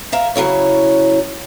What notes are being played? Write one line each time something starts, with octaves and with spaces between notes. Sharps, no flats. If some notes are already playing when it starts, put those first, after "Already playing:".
A#4 E5 F5
C#3 F#3 E4 C#5